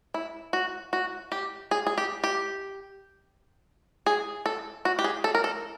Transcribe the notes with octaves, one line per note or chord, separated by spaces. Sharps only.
E4
F#4
F#4
G4
G#4
G#4
G4
G4
G#4
A4
F#4
G4
G#4
A4
A#4
A4